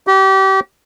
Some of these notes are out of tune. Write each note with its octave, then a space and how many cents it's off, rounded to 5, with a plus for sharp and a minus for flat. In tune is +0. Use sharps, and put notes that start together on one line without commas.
G4 -30